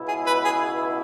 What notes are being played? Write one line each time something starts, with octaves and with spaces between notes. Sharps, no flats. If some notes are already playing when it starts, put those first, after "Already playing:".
Already playing: C#2 B2 B3 E4
G#4
B4
G#4